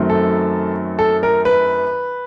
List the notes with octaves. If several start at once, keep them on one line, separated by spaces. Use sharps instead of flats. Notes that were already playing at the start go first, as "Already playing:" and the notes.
Already playing: F#2 D#3 F#3 A3 C4
A4
A4
A#4
B4